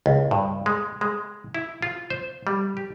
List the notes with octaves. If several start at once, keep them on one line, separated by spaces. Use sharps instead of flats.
C#2
G2
G#3
G#3
E4
F4
C5
G3
G4